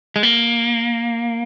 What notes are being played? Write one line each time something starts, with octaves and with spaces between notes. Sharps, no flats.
G#3
A#3